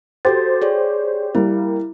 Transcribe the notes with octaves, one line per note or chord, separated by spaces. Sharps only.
F#4 G4 A4 C5 A6
G#4 C#5 D5
G3 A#3 E4